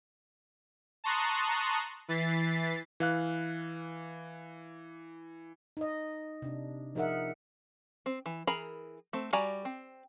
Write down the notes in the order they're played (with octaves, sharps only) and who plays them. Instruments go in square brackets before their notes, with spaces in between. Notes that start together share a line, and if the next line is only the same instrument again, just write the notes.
[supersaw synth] A5 A#5 C6 C#6 D#6 F#6
E3 A6 B6 C7
[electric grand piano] E3 F5 F#6
[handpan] D#4 D#5
C3 D4
F3 D#4 G#4 A#4 E5 F#5
[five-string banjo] C4
E3
E3 G#4 A#4 A#5 B5
A3 C4
G3 F#4 D5 G#5 A#5
C4